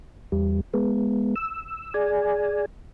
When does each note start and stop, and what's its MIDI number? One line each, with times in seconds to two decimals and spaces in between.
0.32 0.61 40
0.32 0.61 55
0.74 1.35 56
0.74 1.35 59
1.36 1.94 88
1.94 2.65 68
1.94 2.65 74
1.94 2.65 80